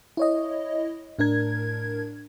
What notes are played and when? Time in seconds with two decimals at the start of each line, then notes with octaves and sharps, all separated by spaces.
0.17 E4 C#5 D#5
1.19 A2 D4 A#4 G#6